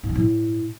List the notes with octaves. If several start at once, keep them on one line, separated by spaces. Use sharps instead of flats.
G#2
F3
A2